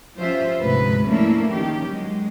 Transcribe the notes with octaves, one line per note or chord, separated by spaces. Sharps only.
F3 C#4 F4 G4 C5 E5
D2 G#2 C3 B4
F3 A3 A#3 C#4 D4 E4
D#3 C#4 G4
F#3 G#3